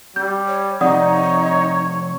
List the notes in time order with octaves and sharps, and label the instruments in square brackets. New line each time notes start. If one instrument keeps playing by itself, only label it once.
[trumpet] G3 [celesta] G6
[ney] C#5
[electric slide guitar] F2 C3 [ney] D#4 [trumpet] C#5 [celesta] D5 F#5 D#6